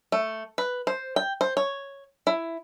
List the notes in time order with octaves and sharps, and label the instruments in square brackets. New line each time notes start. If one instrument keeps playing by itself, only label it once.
[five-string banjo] A3
B4
C5
G5
C5
C#5
E4